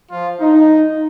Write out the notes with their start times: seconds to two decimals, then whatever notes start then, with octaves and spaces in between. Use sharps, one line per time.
0.11 F3 F4
0.40 D#4